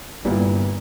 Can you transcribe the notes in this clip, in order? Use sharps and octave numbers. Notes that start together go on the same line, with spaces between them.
G1 G2 A#2 G3 B3 E4